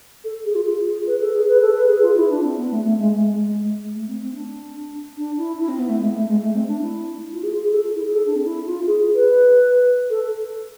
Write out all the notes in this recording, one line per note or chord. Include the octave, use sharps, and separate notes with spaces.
A4
G#4
F4
F4
G#4
B4
A4
G#4
B4
A4
B4
G#4
F4
E4
D4
C4
B3
A3
A3
G#3
G#3
A3
C4
C4
D4
D4
E4
E4
C4
B3
A3
G#3
A3
G#3
A3
C4
D4
E4
F4
G#4
F4
G#4
A4
E4
G#4
A4
D4
C4
E4
F4
G#4
B4
A4